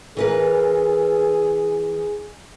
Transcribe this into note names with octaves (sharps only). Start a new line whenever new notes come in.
E3 G#4 A#4 B4